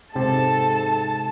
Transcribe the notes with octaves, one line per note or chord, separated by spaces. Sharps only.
G#2 C3 C4 A4 A5